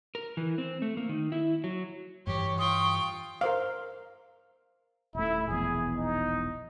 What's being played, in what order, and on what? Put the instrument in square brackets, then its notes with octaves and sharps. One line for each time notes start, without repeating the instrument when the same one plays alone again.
[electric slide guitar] A#4
E3
C4
A3
A#3
D#3
E4
F#3
[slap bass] G2 E3 [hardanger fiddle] G4 [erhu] C#5
[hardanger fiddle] F4 G5 [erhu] C#6 [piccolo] D#6
[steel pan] A#4 C5 F5
[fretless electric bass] D#1 A3 [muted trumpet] E4
[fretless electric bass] E1 A#1 E2 [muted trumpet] G#4
[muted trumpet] D#4